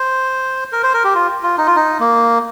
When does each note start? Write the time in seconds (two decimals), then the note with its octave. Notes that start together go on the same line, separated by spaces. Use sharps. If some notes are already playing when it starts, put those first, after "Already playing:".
Already playing: C5
0.72 A#4
0.83 C5
0.94 A#4
1.04 G4
1.15 F4
1.43 F4
1.58 D#4
1.67 F4
1.76 D#4
2.00 A#3